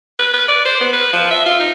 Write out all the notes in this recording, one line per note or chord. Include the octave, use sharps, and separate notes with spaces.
B4
B4
D5
C5
B3
B4
F3
E5
F4
D#4